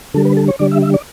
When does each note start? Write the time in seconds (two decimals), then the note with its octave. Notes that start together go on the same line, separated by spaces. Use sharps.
0.14 D3 G3 A4
0.25 B4
0.37 A4
0.48 C#5
0.59 D3 G3 D5
0.71 E5
0.82 E5
0.94 D5